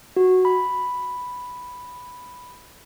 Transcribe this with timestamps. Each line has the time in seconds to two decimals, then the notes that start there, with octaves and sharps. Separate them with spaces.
0.16 F#4
0.45 B5